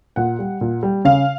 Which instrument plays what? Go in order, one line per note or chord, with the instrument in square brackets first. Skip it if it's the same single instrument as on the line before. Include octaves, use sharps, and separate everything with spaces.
[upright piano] A#2 F#5
G3
A#2
G3
C#3 F5